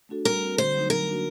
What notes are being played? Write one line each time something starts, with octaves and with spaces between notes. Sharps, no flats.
A3 D4 F#4 A4
G3 A#4
C4 F#4
D3 C5
F#3 A3 D#4
F#3 A#4
A#3 D4 F#4